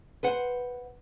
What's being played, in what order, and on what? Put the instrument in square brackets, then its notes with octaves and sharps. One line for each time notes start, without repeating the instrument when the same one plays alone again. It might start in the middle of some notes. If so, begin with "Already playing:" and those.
[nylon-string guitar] B4 C5 F#5